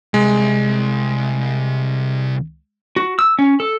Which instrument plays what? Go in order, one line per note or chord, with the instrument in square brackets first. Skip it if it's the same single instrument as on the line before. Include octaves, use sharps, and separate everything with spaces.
[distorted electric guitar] C2 [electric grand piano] G#3
[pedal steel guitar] F#4
E6
C#4
A4